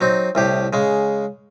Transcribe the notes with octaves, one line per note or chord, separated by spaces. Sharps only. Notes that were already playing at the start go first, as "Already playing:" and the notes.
F#3 C4 D#4
C2 A2 G4
C#3 G#3